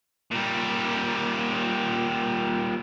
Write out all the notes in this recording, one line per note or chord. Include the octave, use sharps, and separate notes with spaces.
A#2 G3